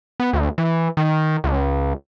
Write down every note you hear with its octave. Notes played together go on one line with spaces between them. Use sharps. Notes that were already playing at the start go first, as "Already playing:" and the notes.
B3
D2
E3
D#3
C#2